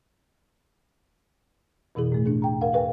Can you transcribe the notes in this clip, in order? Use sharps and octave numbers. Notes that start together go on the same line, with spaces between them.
F2 B2 E3 E4 G#4
A2 A3
D4 G#4
E2 G5 A#5
A#4 F5 F#5
G#4 A#4 B4 F5 G5 G#5